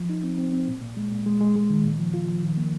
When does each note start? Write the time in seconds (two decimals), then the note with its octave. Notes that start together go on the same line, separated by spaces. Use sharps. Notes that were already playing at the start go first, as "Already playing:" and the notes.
Already playing: F3
0.09 D#4
0.24 C4
0.38 C4
0.53 C4
0.68 A#2
0.82 A#2
0.97 G#3
1.12 A#2
1.26 G#3
1.41 G#3
1.56 G#3
1.70 D#3
1.84 A#2
1.99 F3
2.14 F4
2.28 F3
2.42 D#3
2.57 A#3